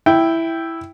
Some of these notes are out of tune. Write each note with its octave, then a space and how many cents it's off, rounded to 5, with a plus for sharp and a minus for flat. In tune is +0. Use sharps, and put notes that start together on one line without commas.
E4 +0 G5 +0